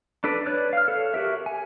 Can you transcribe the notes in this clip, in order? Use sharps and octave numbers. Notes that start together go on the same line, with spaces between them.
D4 A4 B4 D5
B4 C#5 D5 F#6
F5 F6
A4 C#5
F#4 G4 A#4 E5
G#5